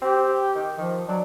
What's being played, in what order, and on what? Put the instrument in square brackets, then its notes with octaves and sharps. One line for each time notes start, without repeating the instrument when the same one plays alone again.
[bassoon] C4 [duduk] G4
[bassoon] D#3
[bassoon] D#3 [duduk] F3
[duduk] F#3 [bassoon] D4